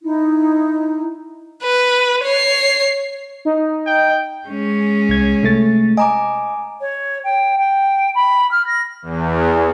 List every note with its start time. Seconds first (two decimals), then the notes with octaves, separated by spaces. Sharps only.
0.03 D#4 E4
1.63 B4
2.24 C#5 C7
3.45 D#4
3.86 G5
4.48 G#3 C#4
5.09 C2 G#6
5.43 C3 A3 A6
5.97 D#5 G#5 A#5 D6
6.81 C#5
7.24 G5
7.58 G5
8.15 B5
8.51 F6
8.67 A#6
9.02 E2